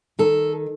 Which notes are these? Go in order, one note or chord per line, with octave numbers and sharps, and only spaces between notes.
D#3 A4